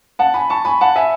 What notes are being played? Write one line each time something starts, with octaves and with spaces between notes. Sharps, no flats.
F#5 A5
G#5 B5
A5 C#6
G#5 B5
F#5 A5
E5 G#5